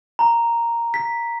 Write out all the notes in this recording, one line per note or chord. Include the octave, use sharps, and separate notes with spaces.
A#5
B6